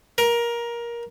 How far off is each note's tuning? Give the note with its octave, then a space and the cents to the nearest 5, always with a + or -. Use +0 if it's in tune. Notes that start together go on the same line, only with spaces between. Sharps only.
A#4 +15